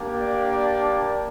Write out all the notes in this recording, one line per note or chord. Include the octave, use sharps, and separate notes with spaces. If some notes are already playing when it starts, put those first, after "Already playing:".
Already playing: A#3 D4 G4
D5